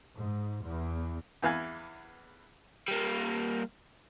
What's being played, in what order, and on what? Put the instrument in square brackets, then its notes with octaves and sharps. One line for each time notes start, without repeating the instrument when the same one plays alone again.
[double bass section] G#2
E2
[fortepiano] E2 E3 F5 G#5
[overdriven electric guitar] G3 A#3